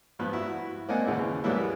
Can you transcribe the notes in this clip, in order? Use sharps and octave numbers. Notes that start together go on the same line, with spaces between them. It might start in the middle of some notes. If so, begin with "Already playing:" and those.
G2 F3 B3 F#6
E4 F#4
A#3 C4 D5 D#5 F#5 G#5
D#2 C#3 E3
G#2 F#3 G3 A#3 B3 E4